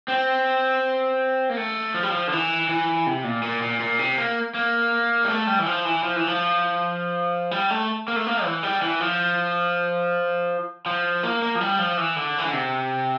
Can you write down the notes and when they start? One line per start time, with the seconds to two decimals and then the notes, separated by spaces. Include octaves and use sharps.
0.08 C4
1.50 A#3
1.57 A3
1.94 F3
2.03 G3
2.11 F3
2.27 D3
2.32 E3
2.69 E3
3.07 C3
3.24 A#2
3.42 A#2
3.62 A#2
3.80 A#2
3.99 C3
4.18 A#3
4.55 A#3
5.24 G3
5.28 A3
5.47 G3
5.59 E3
5.66 F3
5.85 E3
6.03 F3
6.16 E3
6.27 F3
7.51 G3
7.70 A3
8.08 A#3
8.16 A3
8.27 A#3
8.44 E3
8.63 G3
8.82 E3
9.00 F3
10.86 F3
11.23 A#3
11.42 A#3
11.55 F3
11.61 G3
11.79 F3
11.97 E3
12.16 D3
12.38 E3
12.45 D3
12.53 C3